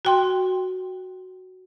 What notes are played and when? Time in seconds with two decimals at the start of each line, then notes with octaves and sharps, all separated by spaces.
0.05 F#4 G5 C6